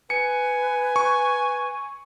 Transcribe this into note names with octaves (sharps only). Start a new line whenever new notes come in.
B4 G#5 C#7
C#6